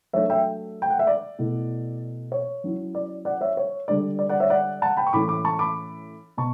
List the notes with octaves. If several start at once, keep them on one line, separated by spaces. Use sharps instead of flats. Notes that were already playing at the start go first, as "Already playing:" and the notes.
F#3 A3 D4 C#5 E5
E5 G5
G5
F#5
E5
D5
B2 A3 E4
C#5
F#3 C#4 E4
D5
D5 F#5
C#5 E5
C#5
D3 G3 D4 D5
D5
D5 F#5
C#5 E5
D5 F#5
F#5 A5
G5 B5
C#6
A2 E3 A3 C#4 E4 B5 D6
B5 D6
A5 C#6
B5 D6
B2 A5 C#6